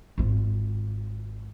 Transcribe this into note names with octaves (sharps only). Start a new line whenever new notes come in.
G#1 F4